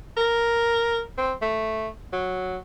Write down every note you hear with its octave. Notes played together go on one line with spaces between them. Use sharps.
A#4
C4
A3
F#3